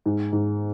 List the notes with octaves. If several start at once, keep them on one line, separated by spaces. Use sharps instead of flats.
G#2
G#2